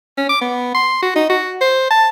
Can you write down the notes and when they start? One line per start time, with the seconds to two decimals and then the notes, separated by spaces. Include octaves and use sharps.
0.18 C#4
0.29 D6
0.41 B3
0.75 C6
1.03 F#4
1.16 D#4
1.30 F#4
1.61 C5
1.91 A5